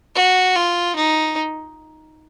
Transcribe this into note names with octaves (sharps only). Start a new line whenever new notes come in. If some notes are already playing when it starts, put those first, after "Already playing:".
F#4
F4
D#4